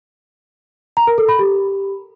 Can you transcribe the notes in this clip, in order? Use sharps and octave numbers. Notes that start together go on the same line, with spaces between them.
A#5
A#4
A4
B5
G4